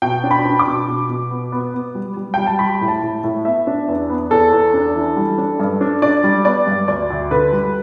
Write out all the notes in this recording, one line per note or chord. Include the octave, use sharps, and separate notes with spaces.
B2 G5
D4
B5
D4
D6
B2
B2
B2
B3
B3
B3
G3
G3
G3 G5
A5
G3 B5
A2
A5
A2
A2
B3 E5
D4
E2
B3
E2 A4
E2
D4
E3
G3
D4
G2
D4
D4 D5
G3
B3 D5
G2
D2 D5
D2
D3 B4
G3